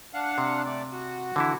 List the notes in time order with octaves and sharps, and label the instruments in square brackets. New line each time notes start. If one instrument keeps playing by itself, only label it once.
[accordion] D4 F5 F#5
[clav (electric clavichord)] C3
[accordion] A3 D5
F#4
[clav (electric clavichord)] D3 E3 E4